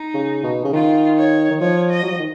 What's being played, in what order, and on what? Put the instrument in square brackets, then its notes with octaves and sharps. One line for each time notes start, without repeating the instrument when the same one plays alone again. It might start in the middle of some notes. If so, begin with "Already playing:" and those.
Already playing: [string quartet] D#4
[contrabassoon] C#3
B2
C#3
[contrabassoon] D#3 [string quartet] F4
[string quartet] C#5
[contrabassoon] D#3
[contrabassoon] F3 [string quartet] C#5
[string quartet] D#5
[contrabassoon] F#3
F3
D#3